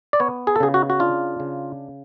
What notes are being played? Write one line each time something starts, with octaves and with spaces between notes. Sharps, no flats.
D5
B3 C#5
G#4
A4
C#3 G#4
F#4
F#4
D4 F4
C#3